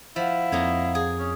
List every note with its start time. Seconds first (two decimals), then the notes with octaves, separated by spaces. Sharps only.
0.16 F3 E4 F5 F#5
0.52 F2 A#3 D#4 C#5
0.95 G#4
1.19 C#4 D#6